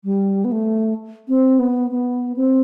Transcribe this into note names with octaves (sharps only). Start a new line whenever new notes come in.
G3
B3
A3
C4
B3
B3
C4